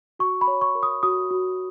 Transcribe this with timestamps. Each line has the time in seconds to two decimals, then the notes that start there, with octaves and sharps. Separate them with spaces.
0.19 F#4 C#6
0.41 B5
0.48 C#5
0.61 C#6
0.75 A#4
0.83 D#6
1.03 F#4 D#6
1.31 F#4